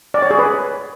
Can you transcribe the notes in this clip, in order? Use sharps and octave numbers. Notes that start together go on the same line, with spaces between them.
D5
C#5
G#4
B4